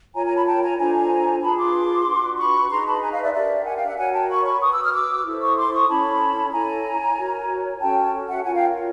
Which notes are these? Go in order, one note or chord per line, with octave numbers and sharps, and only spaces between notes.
F4 A#4 C#5 G#5 A#5
G#5 A#5
A5 B5
G5 A5
G#5 A#5
D4 F4 A4 C5 G#5 A#5
F4 G#4 B4 A5 B5
C6 D6
D4 F#4 B4
B5 C#6
D#4 G#4 B4 A#5 C6
A5 B5
G#5 A#5
D#5 F5
D5 E5
D4 G4 A#4 D5 E5
F#5 G#5
F5 G5
E5 F#5
F#4 A#4 C#5 F#5 G#5
G5 A5
B5 C#6
B5 C#6
F#4 B4 C#6 D#6
D6 E6
D#6 F6
D6 E6
E4 A4 C5
C#6 D#6
C6 D6
C#6 D#6
C#4 E4 A4 C#5 A5 B5
E4 A4 C#5 G#5 A#5
F#4 A#4 C#5
C#4 F#4 A4 G5 A5
E5 F#5
F4 A#4 C#5 F#5 G#5
F5 G5